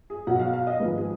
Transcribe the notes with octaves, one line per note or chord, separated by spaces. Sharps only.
G#4
B1 B2 F#3 F#5
F5
F5
D#5
G#1 G#2 F3 G#3 B4
G#4